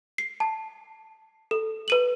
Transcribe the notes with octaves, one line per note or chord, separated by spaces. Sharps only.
C7
A5
A4
B4 D#7 F#7